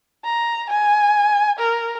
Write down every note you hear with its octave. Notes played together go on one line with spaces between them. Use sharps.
A#5
G#5
A#4